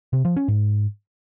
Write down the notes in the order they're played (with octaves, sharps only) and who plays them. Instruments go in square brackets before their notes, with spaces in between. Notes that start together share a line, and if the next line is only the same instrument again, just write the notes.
[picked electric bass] C3
F3
C#4
G#2